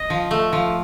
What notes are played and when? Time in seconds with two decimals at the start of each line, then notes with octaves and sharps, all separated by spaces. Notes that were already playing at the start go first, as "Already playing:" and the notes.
Already playing: D#5
0.10 F3
0.31 A3
0.52 F3